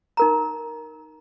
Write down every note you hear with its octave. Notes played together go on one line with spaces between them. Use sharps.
D#4 A#4 A#5